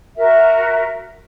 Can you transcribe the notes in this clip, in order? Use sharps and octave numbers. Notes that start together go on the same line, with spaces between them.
F#4 A#4 E5